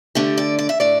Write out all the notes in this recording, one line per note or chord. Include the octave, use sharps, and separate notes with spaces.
D3 A3 D4 G4
D5
D5
E5
A2 A3 D4 D5